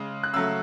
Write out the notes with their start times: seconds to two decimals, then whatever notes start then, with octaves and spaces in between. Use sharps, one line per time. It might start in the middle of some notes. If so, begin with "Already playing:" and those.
Already playing: C#3 G#3
0.24 F#6
0.34 C#3 F#3 A3 E6